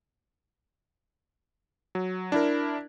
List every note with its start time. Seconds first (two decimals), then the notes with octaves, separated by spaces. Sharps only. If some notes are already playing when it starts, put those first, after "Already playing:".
1.95 F#3
2.32 D4 E4 A#4